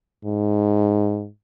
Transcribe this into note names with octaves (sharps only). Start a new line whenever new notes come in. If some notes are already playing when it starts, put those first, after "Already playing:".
G#2